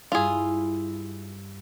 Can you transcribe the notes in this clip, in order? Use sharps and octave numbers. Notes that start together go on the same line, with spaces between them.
G2 E4 F4 G#4